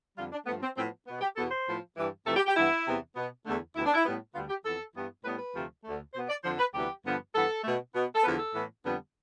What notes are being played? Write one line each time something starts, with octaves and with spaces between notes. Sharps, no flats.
F2 D3 G3 F4
D4
G2 F3 A3 B3
C4
A2 F3 B3 C4
B2 B3
G4
E2 B2 B3 A4
C5
A2 F3 B3
G2 E3 G3
F2 C3 E3 A3 A4
G4
G4
G2 E3 B3 E4
E2 C3 E3 B3
B2 B3
E2 D3 A3
D2 C3 E3 B3 E4
D4
E4
A2 G3 B3
D2 D3 G3 B3 F4
G4
F2 E3 B3 A4
G2 E3 B3
A2 G3 B3 B4
B4
D2 C3 F3 A3
D2 D3 A3
B2 B3 C5
D5
F2 D3 F3 C5
B4
D2 C3 E3 G3 B3 G4
G2 D3 F3 B3
G2 E3 B3 A4
B2 A3
B2 B3
A4
E2 D3 F3 B3 B4
A4
A2 E3 B3
F2 D3 G3 B3